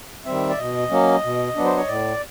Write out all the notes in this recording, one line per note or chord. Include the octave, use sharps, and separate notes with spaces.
D#3 G3 C4 E5
D5
B2 D#5
F#3 A#3 C#4
B2
F#3 B3 D4
C5
C#5
A2 D5